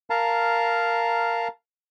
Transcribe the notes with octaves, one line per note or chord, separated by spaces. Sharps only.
A#4 F5 A5 A#5